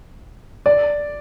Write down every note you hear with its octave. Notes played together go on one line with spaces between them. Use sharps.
D5